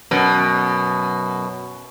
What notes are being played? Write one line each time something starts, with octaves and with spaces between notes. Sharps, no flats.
F#2 B2